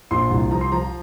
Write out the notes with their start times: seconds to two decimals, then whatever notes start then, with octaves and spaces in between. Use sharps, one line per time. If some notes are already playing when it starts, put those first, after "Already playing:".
0.11 A#1 C6
0.31 C2
0.51 F3 A#5
0.61 C6
0.72 F3 A#5